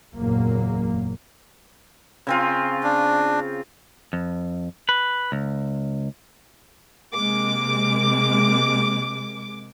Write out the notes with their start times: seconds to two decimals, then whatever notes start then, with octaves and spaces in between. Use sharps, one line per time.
0.16 F#1 E2 A#2 F#3 A#3
2.27 C#3 C4 F4
2.83 D4
4.13 F2
4.89 B4
5.32 C#2
7.13 C3 G#3 A#3 D6